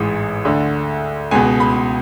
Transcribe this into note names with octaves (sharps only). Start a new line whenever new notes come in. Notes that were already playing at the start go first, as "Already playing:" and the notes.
Already playing: A1 G#2 E3
D2 D3
C#2 B2 G#5
B5